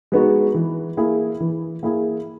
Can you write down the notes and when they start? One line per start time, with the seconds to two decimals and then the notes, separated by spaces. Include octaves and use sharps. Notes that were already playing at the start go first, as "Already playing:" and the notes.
0.12 G#3 B3 D#4 F#4
0.55 E3
0.97 A#3 E4 G#4
1.40 E3
1.83 A#3 E4 G#4